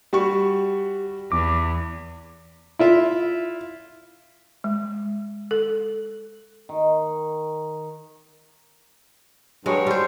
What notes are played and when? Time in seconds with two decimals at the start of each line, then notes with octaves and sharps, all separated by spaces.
0.13 G3 F#4 G4 C#6
1.32 E2 D6
2.79 E4 F4 E5
4.64 G#3
5.51 A4
6.69 D#3
9.66 G2 F#3 G#3 C#5
9.87 G3 C5